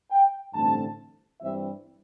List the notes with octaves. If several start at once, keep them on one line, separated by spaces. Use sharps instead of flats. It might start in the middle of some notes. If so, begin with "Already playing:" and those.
G5
A1 G2 D3 A3 C4 A5
G2 E3 G3 C4 E5